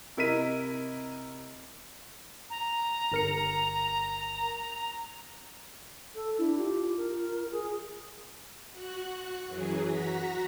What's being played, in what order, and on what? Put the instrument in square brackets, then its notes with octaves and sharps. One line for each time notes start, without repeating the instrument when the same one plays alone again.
[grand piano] C3 E4 A#4 D#5 B6 D#7
[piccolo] A#5
[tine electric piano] G1 A#4 C#7
[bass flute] A4
[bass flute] D4 [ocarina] E4
[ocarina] F4 [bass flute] G4
[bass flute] A#4
G#4
[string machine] F#4 F#6
F#2 E3 F#3 G#4
F#4 F#5 A#5 A#6 B6